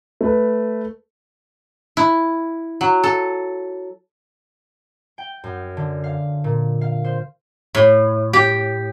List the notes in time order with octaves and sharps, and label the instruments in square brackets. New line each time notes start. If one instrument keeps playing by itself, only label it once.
[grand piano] A3 B4
[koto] E4
F#3
A4
[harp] G5
F#2
D3
F5
A#2
F5
C5
[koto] A2
G4